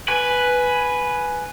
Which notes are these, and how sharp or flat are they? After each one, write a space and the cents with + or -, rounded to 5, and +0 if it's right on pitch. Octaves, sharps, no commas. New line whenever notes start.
B4 +0 G#5 +10